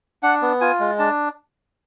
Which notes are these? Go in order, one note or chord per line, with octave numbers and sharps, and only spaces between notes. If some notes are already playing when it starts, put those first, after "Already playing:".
D4 F#5
B3
F4 G#5
G#3
D4 A5